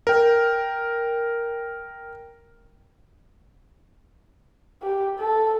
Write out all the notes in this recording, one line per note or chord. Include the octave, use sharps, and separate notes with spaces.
A#4 G5
G4
A4